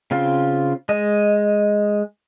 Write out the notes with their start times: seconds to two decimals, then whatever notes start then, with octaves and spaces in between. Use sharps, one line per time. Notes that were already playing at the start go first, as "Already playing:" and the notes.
0.11 C#3 C4 F4
0.89 G#3 D#5